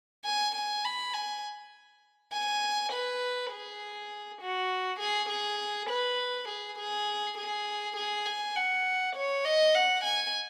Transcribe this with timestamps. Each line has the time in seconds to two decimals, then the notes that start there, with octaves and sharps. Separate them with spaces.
0.25 G#5
0.55 G#5
0.85 B5
1.14 G#5
2.33 G#5
2.92 B4
3.52 G#4
4.42 F#4
5.00 G#4
5.29 G#4
5.89 B4
6.49 G#4
6.79 G#4
7.38 G#4
7.97 G#4
8.26 G#5
8.56 F#5
9.16 C#5
9.45 D#5
9.75 F#5
10.04 G#5